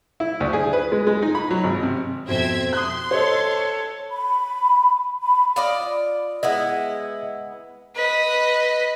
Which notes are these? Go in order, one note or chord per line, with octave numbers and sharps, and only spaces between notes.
E4
D2
G#4
B4
G#3
G#3
D#4
B5
F#3
G#1
C3
F2 B2 C4 E5 G#6
C6 D#6 F#6
A4 C5 C#5 D#5
B5
B5
F4 D5 D#5
G#3 B3 E4 D#5 E5
B4 D#5